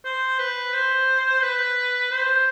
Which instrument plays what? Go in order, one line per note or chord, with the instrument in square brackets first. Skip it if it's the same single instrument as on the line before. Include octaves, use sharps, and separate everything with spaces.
[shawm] C5
B4
C5
B4
C5